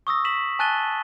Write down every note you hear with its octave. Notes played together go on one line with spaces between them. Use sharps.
C#6 D#6 E6 A#6
B6 E7 F#7
G#5 A5 F#6 A6 D#7 G7